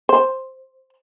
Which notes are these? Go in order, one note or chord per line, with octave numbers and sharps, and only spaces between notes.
C5